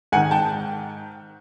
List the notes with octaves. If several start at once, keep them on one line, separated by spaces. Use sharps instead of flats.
G#2 D#3 F#5 G#5
G5 A5